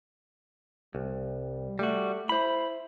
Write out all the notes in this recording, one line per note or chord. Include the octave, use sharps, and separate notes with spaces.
C2 G3
G3 A3 F#4
E4 C5 B5